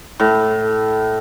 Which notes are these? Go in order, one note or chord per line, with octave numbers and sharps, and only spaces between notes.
A2